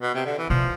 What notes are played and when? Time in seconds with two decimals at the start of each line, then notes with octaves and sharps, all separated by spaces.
0.02 B2
0.14 C3
0.26 D3
0.38 E3
0.50 B2 F3